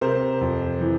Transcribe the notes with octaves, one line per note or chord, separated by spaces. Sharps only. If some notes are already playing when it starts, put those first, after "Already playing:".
C3 A#4 C5
F2
E3